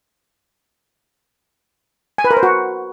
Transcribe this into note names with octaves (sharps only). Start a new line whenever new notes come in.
G#5
B4
A#4
C5
F#4